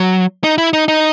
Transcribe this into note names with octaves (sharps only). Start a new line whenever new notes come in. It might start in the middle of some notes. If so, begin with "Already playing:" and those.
Already playing: F#3
D#4
E4
D#4
D#4